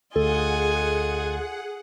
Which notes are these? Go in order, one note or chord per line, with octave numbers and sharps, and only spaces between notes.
D2 F4 G#4 A4 D#5 F#5 G#5